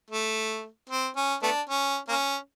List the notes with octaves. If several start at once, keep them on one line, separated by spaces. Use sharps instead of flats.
A3
C4
C#4
A3 B3 D4
C#4
A#3 C#4